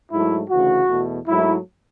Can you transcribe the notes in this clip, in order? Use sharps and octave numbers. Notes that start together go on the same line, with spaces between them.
G#2 F#3 A3 E4
D2 C#3 E3 F#4
E2 B2 A3
G#2 F#3 A3 E4